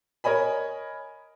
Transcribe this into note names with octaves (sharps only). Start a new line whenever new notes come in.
A#4 C#5 D#5 G#5 B5